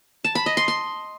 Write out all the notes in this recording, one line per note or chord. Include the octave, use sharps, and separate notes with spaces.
A5
B5
D#5
C6
C6